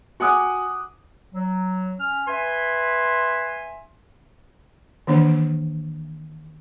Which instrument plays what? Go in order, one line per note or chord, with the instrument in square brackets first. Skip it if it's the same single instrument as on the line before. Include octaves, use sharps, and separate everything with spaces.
[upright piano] F#4 F#5 G#5 D6 D#6 F#6
[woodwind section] F#3
C#4 F6
B4 E5 G#5 C6
[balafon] D#3 E3 A#3 D4